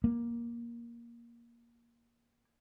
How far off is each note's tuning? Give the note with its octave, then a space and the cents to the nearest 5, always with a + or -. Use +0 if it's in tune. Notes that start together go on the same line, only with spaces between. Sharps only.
A#3 +15